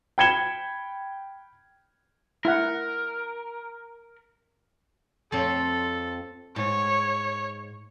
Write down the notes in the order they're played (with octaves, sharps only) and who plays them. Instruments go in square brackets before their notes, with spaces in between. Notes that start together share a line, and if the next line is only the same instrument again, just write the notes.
[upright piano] G5 B5 G#6 C#7 E7 G7
[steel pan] E4 F#5 [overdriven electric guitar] A#4
[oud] F2 C4 C#5 [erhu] A4
[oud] G#2 [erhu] C#5